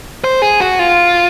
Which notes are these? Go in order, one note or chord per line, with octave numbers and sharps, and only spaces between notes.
C5
G#4
F#4
F4